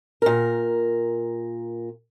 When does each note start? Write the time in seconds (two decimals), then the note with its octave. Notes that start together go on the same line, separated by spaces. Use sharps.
0.22 A#2 A#4